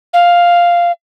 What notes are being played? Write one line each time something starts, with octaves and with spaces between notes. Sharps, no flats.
F5